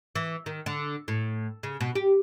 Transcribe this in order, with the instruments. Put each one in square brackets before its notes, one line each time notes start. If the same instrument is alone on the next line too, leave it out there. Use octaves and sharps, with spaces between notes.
[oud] E3
D#3
D3
A2
C#3
B2
G4